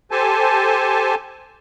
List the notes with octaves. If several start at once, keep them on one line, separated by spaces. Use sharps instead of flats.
G4 A4 C5 G#5 A5